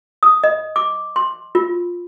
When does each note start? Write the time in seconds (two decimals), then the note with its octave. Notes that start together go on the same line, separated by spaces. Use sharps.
0.23 D#6
0.44 D#5
0.76 D6
1.16 C6
1.55 F4